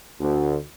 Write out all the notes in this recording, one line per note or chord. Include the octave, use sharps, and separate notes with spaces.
D2